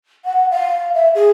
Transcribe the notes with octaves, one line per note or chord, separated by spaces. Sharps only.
F#5
F5
E5
G#4